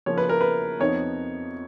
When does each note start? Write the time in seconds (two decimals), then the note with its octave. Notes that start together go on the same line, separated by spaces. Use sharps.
0.06 C#3 F3 A#3 C#4 C#5
0.18 B4
0.29 A#4
0.41 B4
0.80 F2 F3 B3 D#4 C#5